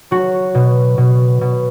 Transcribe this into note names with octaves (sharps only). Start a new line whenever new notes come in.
F#3 F#4
B2
B2
B2